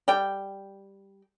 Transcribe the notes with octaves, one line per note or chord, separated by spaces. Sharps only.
G3 G5